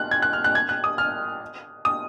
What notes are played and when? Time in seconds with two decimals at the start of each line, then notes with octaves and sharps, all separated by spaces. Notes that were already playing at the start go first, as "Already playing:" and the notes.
Already playing: F#6
0.11 G#6
0.22 F#6
0.33 F6
0.44 F#6
0.55 G#6
0.69 F#6
0.84 D#6
0.98 F6
1.85 D#6